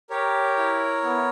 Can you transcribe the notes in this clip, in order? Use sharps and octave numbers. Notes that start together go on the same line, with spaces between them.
G4 A#4 C#5
E4
B3